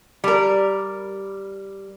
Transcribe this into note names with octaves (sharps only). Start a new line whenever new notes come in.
G3 A#4